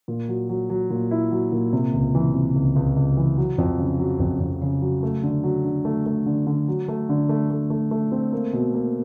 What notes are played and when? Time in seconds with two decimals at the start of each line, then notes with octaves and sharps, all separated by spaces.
0.08 A#2
0.28 F#3
0.49 F#3
0.70 F#3
0.90 A#2
1.11 E4
1.31 F#3
1.52 A#2
1.73 C3
1.94 C#2
2.15 E3
2.34 C3
2.56 C#2
2.76 C#2
2.96 C#2
3.17 E3
3.38 F#3
3.58 F2
3.79 C#3
3.99 F#3
4.20 F2
4.41 F2
4.62 C#3
4.82 F#3
5.03 A3
5.23 D3
5.44 F#3
5.65 D3
5.85 A3
6.06 A3
6.26 D3
6.47 D3
6.68 F#3
6.88 A3
7.09 D3
7.29 A3
7.50 A3
7.70 A3
7.91 A3
8.12 C4
8.33 A#3
8.53 B2
8.74 A#3